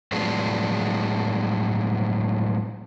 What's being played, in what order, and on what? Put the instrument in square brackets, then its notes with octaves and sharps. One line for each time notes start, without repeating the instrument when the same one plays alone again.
[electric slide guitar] A2 F3 F#3 G#3 B3 D4